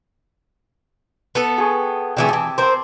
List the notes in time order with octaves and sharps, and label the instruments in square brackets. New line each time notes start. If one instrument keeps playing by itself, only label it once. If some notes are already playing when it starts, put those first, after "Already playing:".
[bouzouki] B3 A4
[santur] G#4 G5 C#6
[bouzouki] D3 E3 A3 [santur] C4 G4 G#4
[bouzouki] E3 F3 [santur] A5
[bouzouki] C4 A#4 C5 [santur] D5 C6